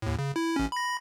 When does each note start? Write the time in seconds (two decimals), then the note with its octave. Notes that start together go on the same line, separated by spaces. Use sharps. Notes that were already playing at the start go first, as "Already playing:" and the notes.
0.02 D#2 A2
0.19 C#3
0.36 E4
0.56 A1 C#4
0.72 B5 A#6